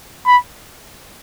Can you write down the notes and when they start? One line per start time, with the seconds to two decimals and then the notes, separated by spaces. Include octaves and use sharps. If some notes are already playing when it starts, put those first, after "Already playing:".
0.26 B5